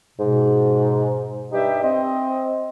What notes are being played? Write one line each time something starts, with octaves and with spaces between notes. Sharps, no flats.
G#2 B2
G2 G3 D#4 G4 E5 G5
C4 D#5